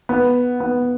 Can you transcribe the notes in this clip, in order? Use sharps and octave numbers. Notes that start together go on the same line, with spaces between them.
B3
B3